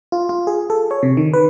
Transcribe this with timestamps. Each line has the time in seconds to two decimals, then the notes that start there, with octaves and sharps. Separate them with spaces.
0.12 F4
0.29 F4
0.47 G#4
0.70 A4
0.91 C#5
1.03 C3
1.17 D#3
1.34 B4